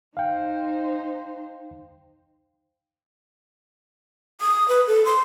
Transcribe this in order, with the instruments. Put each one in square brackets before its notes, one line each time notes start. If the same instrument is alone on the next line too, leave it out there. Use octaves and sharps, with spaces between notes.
[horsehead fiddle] D#4 C5 [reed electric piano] F5 G5
[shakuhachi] D#6
B4
A4
C6